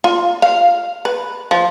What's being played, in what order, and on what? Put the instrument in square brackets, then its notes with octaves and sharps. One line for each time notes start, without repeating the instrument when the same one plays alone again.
[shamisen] F4
F5
B4
F3